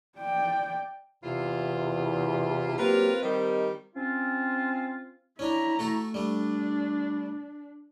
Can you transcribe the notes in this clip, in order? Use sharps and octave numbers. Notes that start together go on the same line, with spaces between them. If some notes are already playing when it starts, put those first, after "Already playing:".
D5 G5
E2 C3 E4 F4
C#2 F#3 A#3 C4 F4 G4 A#4 B4
D#3 G3 D#4 A#4 D#5
C4 C#4 F4
C#4 D4 E4 A#5
A3 F#4 A4
G3 A3 D4